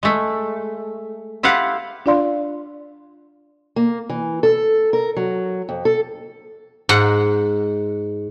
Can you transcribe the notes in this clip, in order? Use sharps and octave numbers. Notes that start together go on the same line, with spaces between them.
G#3 A3
E4 F4 G4 F5 F#5
D4 F4 D5 F5 C6
A#3
E3
A4
A#4
F#3
F2
A4
G#2 F#5